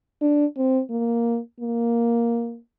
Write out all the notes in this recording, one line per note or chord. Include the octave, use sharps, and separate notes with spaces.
D4
C4
A#3
A#3